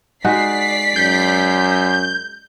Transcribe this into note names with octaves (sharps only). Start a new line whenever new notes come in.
G#3 D#4 F#4 D5 B6 C7
F#2 G6